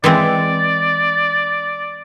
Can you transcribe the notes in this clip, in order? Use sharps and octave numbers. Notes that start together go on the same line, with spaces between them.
E3 G#3 C4 D5